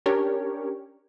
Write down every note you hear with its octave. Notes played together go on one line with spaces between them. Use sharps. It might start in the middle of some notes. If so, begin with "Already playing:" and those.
C#4 D4 G4 A#4 C#5